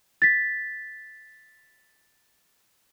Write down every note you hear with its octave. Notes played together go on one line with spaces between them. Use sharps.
A6 B6